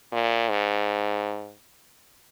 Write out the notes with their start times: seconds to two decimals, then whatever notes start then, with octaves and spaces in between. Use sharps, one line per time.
0.12 A#2
0.50 G#2